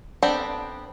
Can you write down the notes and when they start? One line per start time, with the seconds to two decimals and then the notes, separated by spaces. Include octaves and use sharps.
0.23 B3 C4 D4 G4 A4